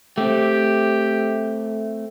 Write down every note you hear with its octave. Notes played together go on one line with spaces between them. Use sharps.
A3 C4 G4